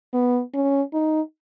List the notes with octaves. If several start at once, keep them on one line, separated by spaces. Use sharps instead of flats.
B3
C#4
D#4